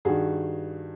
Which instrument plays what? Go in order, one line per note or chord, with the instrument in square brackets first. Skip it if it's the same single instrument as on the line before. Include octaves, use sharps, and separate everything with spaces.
[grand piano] G2 D#3 F#4 G#4